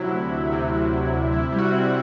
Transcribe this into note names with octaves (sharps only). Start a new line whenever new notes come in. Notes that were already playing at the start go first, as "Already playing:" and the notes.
Already playing: C3 F#3 E4
D2
D2
C3
F#3
D2
D2
C3 E4
G3
F#4
C4